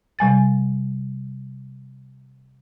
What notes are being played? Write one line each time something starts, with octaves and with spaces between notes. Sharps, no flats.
C3 G3 G#5 A6